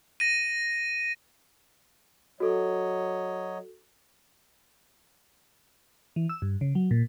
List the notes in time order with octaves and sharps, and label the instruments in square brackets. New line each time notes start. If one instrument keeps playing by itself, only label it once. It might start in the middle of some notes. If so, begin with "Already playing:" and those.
[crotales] A#6 D#7
[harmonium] F#3 C#5 D#5 [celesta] F#4 A4
[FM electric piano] E3
E6
G2
C#3
F#3
A#2